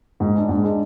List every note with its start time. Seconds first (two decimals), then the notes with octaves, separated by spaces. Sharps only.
0.20 G#2
0.35 G#3 D4
0.49 G#2
0.64 G#3 D4